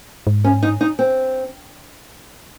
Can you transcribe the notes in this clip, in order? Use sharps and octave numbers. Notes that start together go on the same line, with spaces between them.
G#2
C#4
D#4
D#4
C4